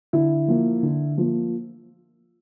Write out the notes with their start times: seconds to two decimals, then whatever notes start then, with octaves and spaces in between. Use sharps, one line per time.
0.13 D3 E4
0.48 F3 A#3
0.83 D3
1.18 F3 A#3